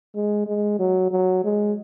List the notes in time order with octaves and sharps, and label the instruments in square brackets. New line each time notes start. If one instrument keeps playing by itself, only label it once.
[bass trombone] G#3
G#3
F#3
F#3
G#3